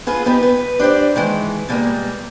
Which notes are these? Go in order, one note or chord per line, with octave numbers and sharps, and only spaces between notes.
F4 G#4 B4
B3 D#4 G4 B4
B4
D4 G4 C5 D5
D#3 E3 G#3
B2 D3 G3 G#3 A#3